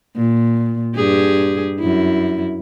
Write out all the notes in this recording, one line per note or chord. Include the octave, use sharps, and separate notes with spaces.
A#2
G2 G4 G#4
F#2 E4